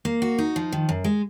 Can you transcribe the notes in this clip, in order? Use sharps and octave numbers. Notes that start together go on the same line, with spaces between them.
A#3
F#4
D#4
F3
D#3
F#2
G#3